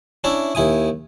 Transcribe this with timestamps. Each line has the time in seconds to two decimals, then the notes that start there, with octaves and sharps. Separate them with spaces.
0.24 C#4 D4 E4 E5
0.55 D#2 E4 G#5 D#6